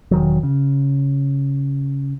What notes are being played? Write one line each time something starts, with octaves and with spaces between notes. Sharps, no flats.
E1 D#3 F#3
C#3